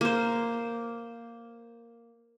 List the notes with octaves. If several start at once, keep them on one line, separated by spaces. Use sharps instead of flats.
A#3 C5